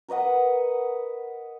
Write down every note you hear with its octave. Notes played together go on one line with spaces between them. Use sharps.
A#4 B4 D#5 F#5